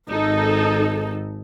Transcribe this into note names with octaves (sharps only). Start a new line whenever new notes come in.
G#1 D#4 A4